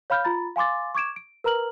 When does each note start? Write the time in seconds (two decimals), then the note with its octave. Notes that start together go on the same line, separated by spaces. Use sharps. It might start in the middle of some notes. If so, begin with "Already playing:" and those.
0.10 C#5 F5 B5 F6 G6
0.24 F4 A#5 B5 A6
0.56 F5 G#5 C6 D6 A6
0.95 C#6 D6 G#6 D7 E7
1.16 D7
1.44 A#4 B4 A#5 F6 F#7